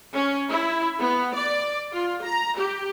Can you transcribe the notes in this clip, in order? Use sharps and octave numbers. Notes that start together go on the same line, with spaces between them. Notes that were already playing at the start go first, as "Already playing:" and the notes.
C#4
E4
B3
D5
F4
A#5
G4